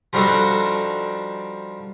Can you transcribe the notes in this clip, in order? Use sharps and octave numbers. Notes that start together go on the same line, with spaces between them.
F3 G3 D4 D#4 F#4 A4